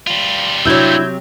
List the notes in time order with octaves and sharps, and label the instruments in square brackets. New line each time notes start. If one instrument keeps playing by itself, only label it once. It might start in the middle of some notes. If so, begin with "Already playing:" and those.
[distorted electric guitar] G3 F4
[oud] C3 F#3 [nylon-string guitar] D4 E4 F#4 [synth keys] E6 G6 G#6